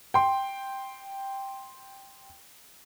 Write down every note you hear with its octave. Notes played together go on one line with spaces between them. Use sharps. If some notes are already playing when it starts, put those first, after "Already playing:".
G5 C6